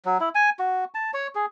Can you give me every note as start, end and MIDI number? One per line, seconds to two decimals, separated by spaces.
0.05 0.18 54
0.20 0.29 64
0.35 0.50 80
0.59 0.85 66
0.95 1.11 81
1.14 1.27 73
1.35 1.46 68